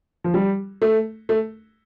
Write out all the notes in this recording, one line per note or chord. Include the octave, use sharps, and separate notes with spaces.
F3
G3
A3
A3